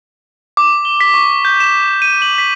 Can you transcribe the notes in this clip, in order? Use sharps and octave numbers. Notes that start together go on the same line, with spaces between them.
D6
G7
B6
C#6
G6
E7
D#7
F#7
B6